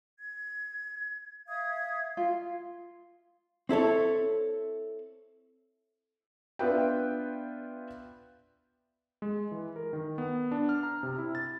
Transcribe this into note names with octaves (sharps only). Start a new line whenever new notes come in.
G#6
E5 F5 D#6 G#6
F4
C4 E4 A4 C#5
B3 D4 F4 B4 E5 G5
G#3
E3
A#4
D#3
B3
D4
F6
A#5
C3
E4
A6